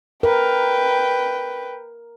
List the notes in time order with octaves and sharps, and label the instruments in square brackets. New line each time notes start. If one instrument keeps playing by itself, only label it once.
[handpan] A#4 [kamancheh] B4 G5